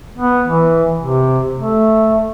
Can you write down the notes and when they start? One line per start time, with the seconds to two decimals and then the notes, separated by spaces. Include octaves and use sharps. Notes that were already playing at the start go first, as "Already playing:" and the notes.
0.18 B3
0.48 E3
1.01 C3
1.58 A3